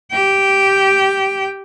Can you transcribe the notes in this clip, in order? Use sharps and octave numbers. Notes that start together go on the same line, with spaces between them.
G4 G5